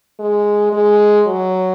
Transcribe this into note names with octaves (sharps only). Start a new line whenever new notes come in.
G#3
G#3
F#3